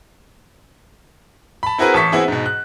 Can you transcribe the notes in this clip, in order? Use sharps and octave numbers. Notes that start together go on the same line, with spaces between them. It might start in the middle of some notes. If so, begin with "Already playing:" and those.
A5 B5
C4 E4 F#4 G#4 A#4 B4
A1 A5 C#6 B6
B3 C4 E4 F#4 G#4
G#2 B2
F#6